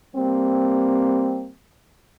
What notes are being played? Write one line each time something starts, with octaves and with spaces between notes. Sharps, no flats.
G3 A#3 C4